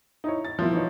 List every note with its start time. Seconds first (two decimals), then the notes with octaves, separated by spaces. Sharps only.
0.24 D#4 E4 C#5
0.45 A6
0.59 B2 F3 A#3 E4
0.73 E3 D#4 C#5